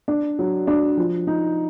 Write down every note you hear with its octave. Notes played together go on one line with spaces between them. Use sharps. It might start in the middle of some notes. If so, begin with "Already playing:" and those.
D4
F#3
D4
F3
D#4